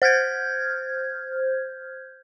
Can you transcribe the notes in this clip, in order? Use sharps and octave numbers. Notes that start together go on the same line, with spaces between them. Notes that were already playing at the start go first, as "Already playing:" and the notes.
C5 F6 G6 G#6